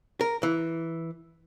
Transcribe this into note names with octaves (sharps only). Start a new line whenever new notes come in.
A#4
E3